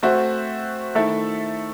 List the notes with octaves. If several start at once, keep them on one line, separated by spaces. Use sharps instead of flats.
A3 C4 F#4 C5 E5
D#3 A3 E4 A4 E5